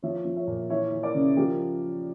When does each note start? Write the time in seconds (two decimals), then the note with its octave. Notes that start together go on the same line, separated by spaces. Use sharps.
0.03 F3 C#5 E5
0.25 F3
0.36 C#5 E5
0.47 A#2
0.70 E3 C#5 E5
0.92 E3
1.03 A#4 D5
1.15 C#3
1.37 F3 G4 A#4